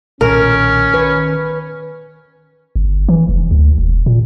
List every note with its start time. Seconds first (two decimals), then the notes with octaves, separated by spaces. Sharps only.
0.21 B1 A#2 D#3 C#4 A#4
0.94 D#3 B4
2.76 G1
3.09 E3
3.29 F1
3.51 D2
3.78 E1
4.06 A#2